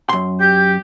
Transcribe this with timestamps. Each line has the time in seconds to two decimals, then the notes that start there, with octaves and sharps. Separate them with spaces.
0.09 F#2 C6
0.40 G4 G6